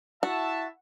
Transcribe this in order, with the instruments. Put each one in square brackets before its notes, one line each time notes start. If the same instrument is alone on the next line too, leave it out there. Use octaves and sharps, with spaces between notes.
[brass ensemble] E4 E5 A5 [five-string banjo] F#4